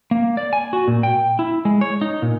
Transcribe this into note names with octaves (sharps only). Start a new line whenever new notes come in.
A#3
D5
G#5
F#4
A#2
G5
E4
G#3
C#5
D#4
A#2